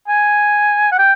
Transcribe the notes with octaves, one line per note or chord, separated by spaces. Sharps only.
G#5
F#5
G5